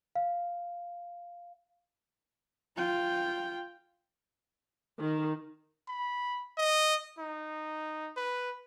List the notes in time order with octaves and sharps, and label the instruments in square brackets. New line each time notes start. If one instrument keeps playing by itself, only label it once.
[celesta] F5
[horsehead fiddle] F4 G5
[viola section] D#3
[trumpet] B5
D#5
D#4
B4